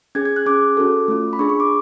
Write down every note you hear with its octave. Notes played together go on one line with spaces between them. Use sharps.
C#4 G#4 G#6
G#6
F#6
C#4 G#4 D6
C#4 F#4 A4
A3 C#4 F4
B5
D4 G#4 C#6
C#6
D6